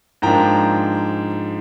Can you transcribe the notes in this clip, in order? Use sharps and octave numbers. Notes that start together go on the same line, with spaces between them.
G#2 F3 A#3 D4 G5 A#5